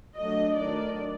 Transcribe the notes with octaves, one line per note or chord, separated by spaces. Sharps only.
F#3 A3 D4 D#5
D#3 F#3 A3 D4 D5